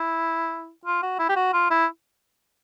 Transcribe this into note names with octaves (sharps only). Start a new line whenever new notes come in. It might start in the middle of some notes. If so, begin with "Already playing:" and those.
Already playing: E4
F4
F#4
E4
G4
F#4
F4
E4